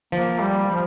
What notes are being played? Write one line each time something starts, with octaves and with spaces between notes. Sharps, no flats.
F3 A#3
G3
F3